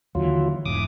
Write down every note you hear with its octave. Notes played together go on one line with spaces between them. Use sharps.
D#2 D3 E3 F#3 F4
E1 G#2 E3 D6 D#6